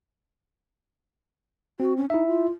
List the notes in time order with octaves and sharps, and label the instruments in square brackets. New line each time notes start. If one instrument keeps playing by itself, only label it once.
[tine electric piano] C4 [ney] F#4
[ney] C#4
[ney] D#4 [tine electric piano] E4 E5
[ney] F4